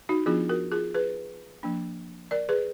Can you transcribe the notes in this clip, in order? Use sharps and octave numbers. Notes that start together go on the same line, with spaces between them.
D#4 F#4
F3 B3 D4 F4 G#4
F#4 A#4
F4 G#4
G#4 B4
F3 A#3 D4
A#4 D5
G#4 B4